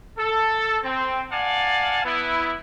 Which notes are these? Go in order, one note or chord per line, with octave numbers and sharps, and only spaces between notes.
A4
C4
D5 F5 F#5 G#5 A5
B3 E4